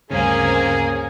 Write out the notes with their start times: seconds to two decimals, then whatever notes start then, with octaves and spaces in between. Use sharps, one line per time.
0.11 D2 G2 C#3 A#3 C4 C#4 G#4 G#5